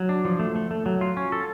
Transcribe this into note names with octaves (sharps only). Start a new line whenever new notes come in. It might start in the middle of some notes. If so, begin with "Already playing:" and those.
Already playing: F#3
D4
F3
A3
A3
A3
F#3
F4
C#4
A4